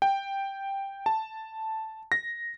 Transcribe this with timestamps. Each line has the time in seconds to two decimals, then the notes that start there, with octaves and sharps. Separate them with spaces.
0.02 G5
1.06 A5
2.12 A#6